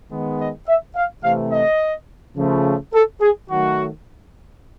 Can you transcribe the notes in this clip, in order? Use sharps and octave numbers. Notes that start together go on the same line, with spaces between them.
D#3 G#3 B3
D#5
E5
F5
C3 E3 A3 F5
D#5
C#3 F3 A3
A4
G#4
D#3 F#3 A3 F#4